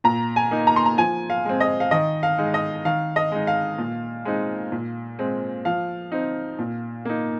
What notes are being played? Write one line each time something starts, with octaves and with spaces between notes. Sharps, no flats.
A#2 A#5
G#5
A#3 D#4
A#5
C6
A#5
F3 G#5
F5
G#3 C4
D#5
F5
D#3 D#5
F5
G#3 D#4
D#5
D#3 F5
D#5
G#3 D#4
F5
A#2
G#3 C4 D#4
A#2
G#3 C4
F3 F5
C4 D#4
A#2
A#3 D#4